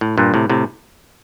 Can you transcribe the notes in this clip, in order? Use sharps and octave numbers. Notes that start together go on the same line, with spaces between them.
A2
G2 A#2
A2 C3
A2 C3